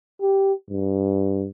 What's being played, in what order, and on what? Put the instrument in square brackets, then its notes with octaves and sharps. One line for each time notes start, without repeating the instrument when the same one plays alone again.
[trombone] G4
G2